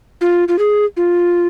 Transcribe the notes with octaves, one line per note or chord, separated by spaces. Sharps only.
F4
F4
G#4
F4